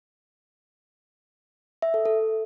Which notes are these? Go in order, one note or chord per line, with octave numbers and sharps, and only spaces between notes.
E5
A4
A4